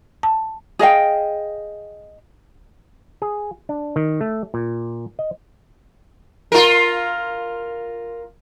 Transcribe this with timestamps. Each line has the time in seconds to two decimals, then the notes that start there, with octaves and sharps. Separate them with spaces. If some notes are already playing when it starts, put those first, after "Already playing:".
0.23 A5
0.79 G#4 D#5 F5 G5
3.22 G#4
3.69 D4
3.96 D#3
4.21 A3
4.54 A#2
5.19 D#5
6.52 F4 A#4